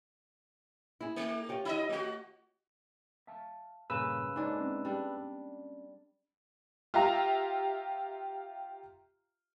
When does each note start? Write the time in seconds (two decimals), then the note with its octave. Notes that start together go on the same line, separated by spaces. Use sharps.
1.01 E4 G#4
1.16 A3
1.49 F4 G4 C#5
1.65 D#4 D#5
1.89 A3 F#4
3.27 E5 F5 A5
3.90 G2 A#2 C#3 A#3 B4 E6
4.36 G#2 D4 C#5 D5 G#5
4.56 C4 C#4 G#4
4.85 G3 D4
6.94 F4 G4 E5 F5 A#5